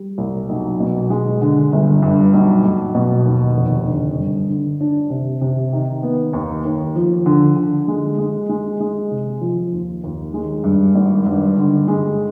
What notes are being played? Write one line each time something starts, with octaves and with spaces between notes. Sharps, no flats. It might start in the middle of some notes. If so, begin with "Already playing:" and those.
Already playing: G3
C2
B1
B2
G#3
D3
G1
G2
B1
B1
B2
D#2
F1
D3
G2
D3
D4
C3
C3
D#3
B3
D#2
D#2
F3
D3
D3
G#3
G#3
G#3
G#3
C3
F3
D#2
D#2
G#3
G2
G#1
G2
D3
G#3